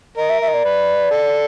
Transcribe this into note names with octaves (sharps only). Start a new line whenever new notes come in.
A#4 D#5
E5
E5
D#5
D5
B4
A4